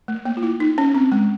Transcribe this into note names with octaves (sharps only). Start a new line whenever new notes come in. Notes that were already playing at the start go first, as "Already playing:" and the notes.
A3
A#3
F4
E4
D#4
C#4
C4
G#3